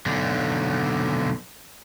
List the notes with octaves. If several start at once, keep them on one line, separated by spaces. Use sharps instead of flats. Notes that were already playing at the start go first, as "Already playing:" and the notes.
B1 D3